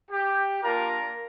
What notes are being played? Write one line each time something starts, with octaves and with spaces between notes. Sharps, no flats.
G4
A#3 D4 F4 A#4